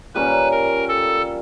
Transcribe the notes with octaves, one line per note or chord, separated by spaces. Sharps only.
A#2 G3 A#3 C#4 B4
A#4
A4